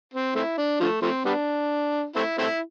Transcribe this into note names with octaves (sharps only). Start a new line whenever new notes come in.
C4
A3 C4 E4
D4
D3 F3 A3
F3 A3 C4
G3 B3 D4
A3 C4 E4
A3 C4 E4